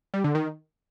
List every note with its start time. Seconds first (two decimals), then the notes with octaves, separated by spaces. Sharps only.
0.14 G3
0.24 D3
0.35 D#3